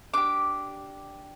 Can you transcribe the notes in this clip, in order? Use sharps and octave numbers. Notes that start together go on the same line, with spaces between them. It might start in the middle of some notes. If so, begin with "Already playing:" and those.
D4 G4 D6